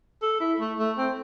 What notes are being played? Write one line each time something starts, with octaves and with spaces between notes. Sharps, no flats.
A4
E4
A3
A3
C4